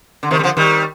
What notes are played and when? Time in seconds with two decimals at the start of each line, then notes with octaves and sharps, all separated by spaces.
0.23 D3
0.31 C3 D#3
0.39 G3
0.43 D3 F3
0.57 D#3 G3